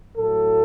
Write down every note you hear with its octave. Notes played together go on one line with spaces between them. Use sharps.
A2 F#3 A3 A4